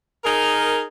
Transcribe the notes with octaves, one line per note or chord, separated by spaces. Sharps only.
D#4 G#4 A#4